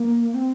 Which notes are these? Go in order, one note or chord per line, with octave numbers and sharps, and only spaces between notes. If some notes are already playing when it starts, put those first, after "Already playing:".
Already playing: A#3
C4